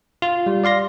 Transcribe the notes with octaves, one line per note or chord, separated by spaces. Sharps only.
F4
G3
D5 F5 C6 A#6